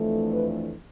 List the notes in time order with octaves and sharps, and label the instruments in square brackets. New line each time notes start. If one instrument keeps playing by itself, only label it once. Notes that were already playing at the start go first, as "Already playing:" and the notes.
Already playing: [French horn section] F2 E3 A3 D4
B4